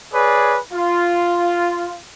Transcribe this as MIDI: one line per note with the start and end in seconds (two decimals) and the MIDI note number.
0.13 0.57 68
0.13 0.57 71
0.13 0.57 73
0.13 0.57 74
0.73 1.96 65